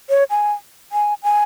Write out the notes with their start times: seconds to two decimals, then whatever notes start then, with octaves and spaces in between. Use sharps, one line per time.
0.09 C#5
0.30 G#5
0.92 G#5
1.23 G#5